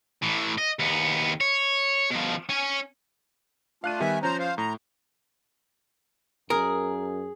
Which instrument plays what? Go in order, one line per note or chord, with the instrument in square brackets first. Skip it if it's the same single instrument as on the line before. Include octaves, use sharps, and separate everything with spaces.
[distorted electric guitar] A2 E3
D#5
D#2 B3
C#5
B2 F3
C#4 G#5
[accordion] A3 D4 F4 [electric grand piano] F5 F#6 D#7
[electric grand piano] D#3 G3 B3 [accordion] E5 G#5
[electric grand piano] F3 C#4 [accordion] C5 A#5
[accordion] C5 F5
[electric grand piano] A2 [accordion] A#5
[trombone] F#2 [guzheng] G#4 [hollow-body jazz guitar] A#4